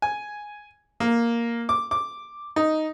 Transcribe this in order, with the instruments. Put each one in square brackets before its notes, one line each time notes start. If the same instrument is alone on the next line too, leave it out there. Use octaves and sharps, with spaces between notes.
[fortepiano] G#5
A#3
D6
D6
D#4